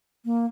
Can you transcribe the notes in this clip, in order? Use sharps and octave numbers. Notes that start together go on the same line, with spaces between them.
A#3